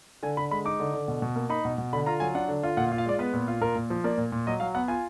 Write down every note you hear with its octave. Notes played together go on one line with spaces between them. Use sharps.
D3 G#5
D3 B5
G#3 B5
D#4 D6
D3
D3
B2
B2
A#3
D#4 B5
B2
B2
D3 B5
F4 A#5
F#3 G#5
D4 F#5
D3
F4
A#2 F#5
F5
F4
F5
G#3 D5
B3 B4
A#2
F4
A#2 A#4
A#2
F3
A#3 D5
A#2
A#2
F#3 D#5
F#3 F5
B3 F#5
F4 G#5